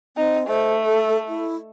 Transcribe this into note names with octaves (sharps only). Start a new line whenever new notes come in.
C4 D#4
A3 C5
A4
E4